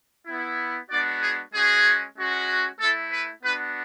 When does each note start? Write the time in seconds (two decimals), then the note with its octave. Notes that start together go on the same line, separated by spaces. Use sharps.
0.27 B3 E4
0.90 G#3 B3 D4 F#4 D5
1.21 G#4
1.54 G#3 C#4 F#4 G#4
2.17 G#3 C#4 F#4
2.80 A3 E4 A4
3.12 B4
3.43 B3 D4 F#4 B4